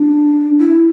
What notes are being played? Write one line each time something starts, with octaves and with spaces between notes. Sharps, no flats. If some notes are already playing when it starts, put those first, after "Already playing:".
Already playing: D4
E4